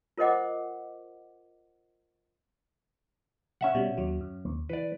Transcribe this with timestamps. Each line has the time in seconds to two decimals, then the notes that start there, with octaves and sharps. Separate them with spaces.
0.18 F4 A#4 C5 D#5 F#5 D6
3.61 C#4 E5 F#5
3.75 B2 G3
3.98 D#2 F#3
4.21 F#2
4.45 D#2
4.69 E3 B4 D5